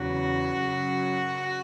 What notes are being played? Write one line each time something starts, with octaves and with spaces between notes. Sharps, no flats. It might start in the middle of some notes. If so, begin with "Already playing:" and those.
Already playing: E2 C#3 F#3 F#4
F#2 C#3 F#3